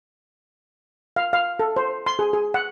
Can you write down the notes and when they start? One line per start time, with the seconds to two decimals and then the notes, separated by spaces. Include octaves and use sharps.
1.16 F5
1.33 F5
1.59 A4
1.76 C5
2.06 C6
2.19 G#4
2.33 G#4
2.54 F#5